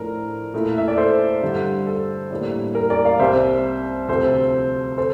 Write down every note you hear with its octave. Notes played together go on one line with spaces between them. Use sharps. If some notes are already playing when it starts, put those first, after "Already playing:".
Already playing: A2 F3 A3 D4 A#4
A#2 A3 E4
E5
D5
A4 C5
G2 D3 G3
A4
A2 G3 A#3 D4
A#4
A#4 D5
D5 F5
C2 C3 G3 C5 E5
D2 C3 F3 C4 A4 C5
A4 C5